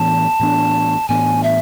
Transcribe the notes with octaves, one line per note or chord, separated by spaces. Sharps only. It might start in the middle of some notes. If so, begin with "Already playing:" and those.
Already playing: A2 E3 B3 D4 A5
A2 E3 B3 D4
A2 E3 B3 D4 G#5
E5